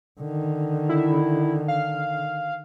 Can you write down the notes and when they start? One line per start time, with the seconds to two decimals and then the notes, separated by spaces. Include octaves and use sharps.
0.20 D3 D#3
0.89 E4
1.68 F5